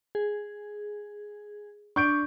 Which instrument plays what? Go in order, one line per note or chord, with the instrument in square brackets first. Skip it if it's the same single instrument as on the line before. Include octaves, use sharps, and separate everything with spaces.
[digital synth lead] G#4
[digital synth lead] D4 [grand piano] C#6 G6 D7